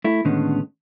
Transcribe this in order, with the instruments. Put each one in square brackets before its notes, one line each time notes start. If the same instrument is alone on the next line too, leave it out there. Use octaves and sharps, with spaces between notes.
[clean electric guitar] A3 E4
A2 D3 D#3 G#3 B3 C#4